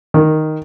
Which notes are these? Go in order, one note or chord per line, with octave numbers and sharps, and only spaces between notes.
D#3